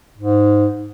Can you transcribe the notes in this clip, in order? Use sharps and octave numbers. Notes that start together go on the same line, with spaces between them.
G#2